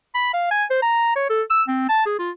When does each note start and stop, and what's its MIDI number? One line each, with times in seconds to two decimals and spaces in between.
0.15 0.31 83
0.34 0.50 77
0.51 0.64 80
0.70 0.78 72
0.82 1.13 82
1.16 1.28 73
1.30 1.42 69
1.50 1.62 88
1.68 1.86 60
1.89 2.04 81
2.06 2.19 68
2.19 2.30 65